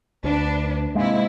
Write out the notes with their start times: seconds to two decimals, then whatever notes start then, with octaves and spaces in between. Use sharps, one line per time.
0.24 D2 D4 B4
0.95 G#2 C3 G#3 A#3 E4